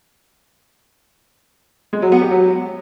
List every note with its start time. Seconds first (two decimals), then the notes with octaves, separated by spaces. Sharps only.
1.93 G#3
2.02 F#3
2.12 B3
2.21 G4
2.31 F#3